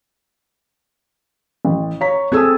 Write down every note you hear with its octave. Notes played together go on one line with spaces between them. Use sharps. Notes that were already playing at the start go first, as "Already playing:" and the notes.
A1
C#5 A#5 B6
C4 G#4 A4 D#6 E6 G#6